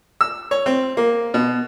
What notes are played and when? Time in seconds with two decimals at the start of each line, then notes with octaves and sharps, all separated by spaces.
0.21 E6
0.51 C#5
0.66 C4
0.97 A#3
1.34 B2